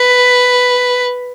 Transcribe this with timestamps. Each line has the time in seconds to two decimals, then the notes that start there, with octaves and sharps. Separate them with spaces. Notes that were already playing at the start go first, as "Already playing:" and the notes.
Already playing: B4